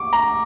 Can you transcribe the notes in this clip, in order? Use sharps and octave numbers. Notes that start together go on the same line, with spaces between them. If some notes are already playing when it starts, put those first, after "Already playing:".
Already playing: C#6 D6
A#5